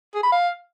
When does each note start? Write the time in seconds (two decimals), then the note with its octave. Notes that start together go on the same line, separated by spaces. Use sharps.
0.14 G#4
0.23 B5
0.32 F5